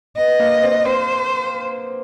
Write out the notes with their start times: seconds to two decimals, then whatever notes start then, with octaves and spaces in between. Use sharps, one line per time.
0.17 B3 D#5
0.39 A#3
0.63 C4
0.85 C4 C5